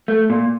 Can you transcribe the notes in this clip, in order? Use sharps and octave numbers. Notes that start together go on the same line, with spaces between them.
A3
A#2